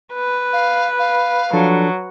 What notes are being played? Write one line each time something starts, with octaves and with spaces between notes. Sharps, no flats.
B4
F5
F5
F3 F#3 D4 A4